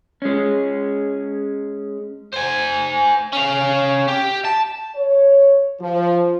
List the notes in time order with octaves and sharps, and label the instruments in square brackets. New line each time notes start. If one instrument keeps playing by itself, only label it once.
[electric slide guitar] G#3 C#4
[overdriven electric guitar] C5 G#5
C#4 F5
G4
A5
[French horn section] C#5
F3